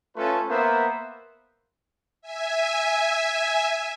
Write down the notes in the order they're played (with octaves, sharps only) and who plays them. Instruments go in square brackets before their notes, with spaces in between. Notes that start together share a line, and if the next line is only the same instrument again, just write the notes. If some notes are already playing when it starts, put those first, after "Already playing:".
[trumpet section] A3 C#4 F4 A4 B4
A#3 B3 A#4 C5 E5 F#5
[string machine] E5 G#5